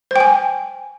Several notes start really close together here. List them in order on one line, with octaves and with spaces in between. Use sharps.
C5 G5 G#5